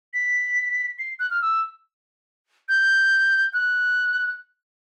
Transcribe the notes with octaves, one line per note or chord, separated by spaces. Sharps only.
B6
C7
F#6
F6
E6
G6
F#6